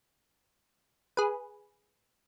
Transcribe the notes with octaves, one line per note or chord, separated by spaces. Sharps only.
G#4 B4